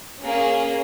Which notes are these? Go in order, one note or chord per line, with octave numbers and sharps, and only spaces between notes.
A#3 C#4 G#4